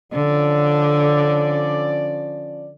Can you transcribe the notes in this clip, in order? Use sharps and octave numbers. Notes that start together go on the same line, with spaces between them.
D3 F3 C#4 D5